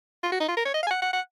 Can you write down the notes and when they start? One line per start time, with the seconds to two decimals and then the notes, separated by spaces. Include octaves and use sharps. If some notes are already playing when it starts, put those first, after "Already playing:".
0.23 F4
0.32 F#4
0.40 D#4
0.48 F4
0.57 A#4
0.65 C#5
0.74 D#5
0.83 F5
0.87 G#5
0.91 F#5
1.02 F#5
1.13 F#5